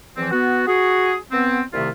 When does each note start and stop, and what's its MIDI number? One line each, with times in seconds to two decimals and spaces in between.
0.17 0.31 40
0.17 0.31 52
0.17 0.31 53
0.17 0.31 60
0.31 0.66 59
0.31 0.66 66
0.67 1.15 66
0.67 1.15 68
1.31 1.61 59
1.31 1.61 60
1.74 1.89 36
1.74 1.89 48
1.74 1.89 51
1.74 1.89 57
1.74 1.89 64
1.74 1.89 65